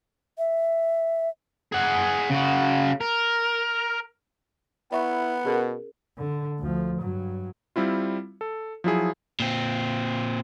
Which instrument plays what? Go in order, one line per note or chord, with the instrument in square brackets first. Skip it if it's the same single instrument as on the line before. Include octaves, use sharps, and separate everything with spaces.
[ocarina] E5
[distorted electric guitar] G#4 F#5
C#3 F#4
A#4
[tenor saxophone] B3 [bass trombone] E4 [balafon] D5 E5 C#6 [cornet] F#5
[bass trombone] B2 [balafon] C#4 G#4 A#4
[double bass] D3
D2 F3
G2 F#3
[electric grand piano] G3 C4 E4 F4
A4
F3 F#3 E4 G#4
[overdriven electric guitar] A#2 C4